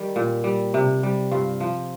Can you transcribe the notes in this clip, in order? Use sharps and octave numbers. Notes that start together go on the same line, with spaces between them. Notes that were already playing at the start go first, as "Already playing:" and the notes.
Already playing: D#3 G3
A#2
G3
C3
G3
G2 F4
F3